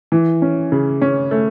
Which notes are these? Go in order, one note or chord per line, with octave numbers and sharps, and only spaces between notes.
E3
C#4
C#3
C#4
A3